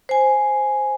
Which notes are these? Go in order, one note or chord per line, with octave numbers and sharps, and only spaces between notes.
C5 G#5